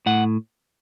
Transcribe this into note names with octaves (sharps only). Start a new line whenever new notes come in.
A2 F#5